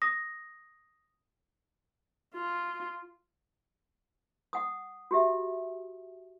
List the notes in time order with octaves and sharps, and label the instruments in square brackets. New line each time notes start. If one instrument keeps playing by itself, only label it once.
[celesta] D#6 A#6
[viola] F4
[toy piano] F#5 D#6
F#4 G4 E5